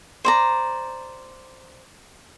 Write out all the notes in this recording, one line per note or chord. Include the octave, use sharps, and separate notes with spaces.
C5 D5 A#5